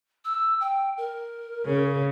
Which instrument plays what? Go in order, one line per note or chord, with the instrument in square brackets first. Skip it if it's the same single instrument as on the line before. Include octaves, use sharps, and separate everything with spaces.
[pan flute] E6
G5
A#4
[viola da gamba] C#3